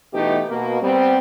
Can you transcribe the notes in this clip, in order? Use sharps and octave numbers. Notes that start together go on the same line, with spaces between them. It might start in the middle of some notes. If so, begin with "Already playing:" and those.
B2 E3 A3 B3 D#4 G4
B2 A#3
G3 B3 C4